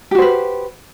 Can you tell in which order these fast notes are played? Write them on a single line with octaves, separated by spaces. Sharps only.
G4 F#4 C5 B4